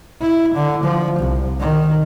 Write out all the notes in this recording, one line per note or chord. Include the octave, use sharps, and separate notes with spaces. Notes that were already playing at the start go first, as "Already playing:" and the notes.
E4
D3
F3
C2
D#3